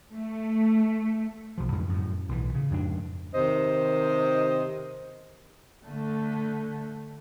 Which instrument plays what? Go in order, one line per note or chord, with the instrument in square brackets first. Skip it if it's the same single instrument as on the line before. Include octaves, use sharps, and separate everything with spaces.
[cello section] A3
[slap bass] B1 F3
F2 G#2 D3 E3
F#2 A2
B1 A2 E3
C#3
F2 G#2 B3 D4
[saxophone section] C3 D#3 C5 D#5
[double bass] D3 A3